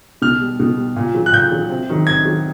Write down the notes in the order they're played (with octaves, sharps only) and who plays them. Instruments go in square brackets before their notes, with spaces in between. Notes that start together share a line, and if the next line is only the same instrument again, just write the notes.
[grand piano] B2 F6
G3
B2
G3
A#2
F#3
F#6
A#2 G6
F#3
C3
D#3 F#3
C3 G#6
D#3 F#3